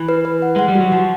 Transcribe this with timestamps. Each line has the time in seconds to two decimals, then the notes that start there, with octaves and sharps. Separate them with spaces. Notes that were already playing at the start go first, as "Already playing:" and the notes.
Already playing: E3
0.09 B4
0.25 B4
0.42 F#5
0.56 G#3 F#5
0.68 G3
0.75 F#3 F#4
0.92 F3 F#5